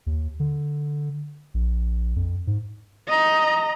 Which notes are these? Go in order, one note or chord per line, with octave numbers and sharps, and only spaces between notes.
D#2
D3
A#1
F2
G#2
D#5 A#5